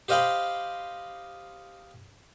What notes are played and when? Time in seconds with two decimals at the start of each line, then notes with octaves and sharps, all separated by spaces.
0.08 G4 C5 D#5 F5 G5 B5